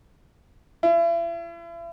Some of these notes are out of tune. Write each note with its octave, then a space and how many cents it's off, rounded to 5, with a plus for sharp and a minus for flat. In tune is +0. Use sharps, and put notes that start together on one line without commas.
E4 +40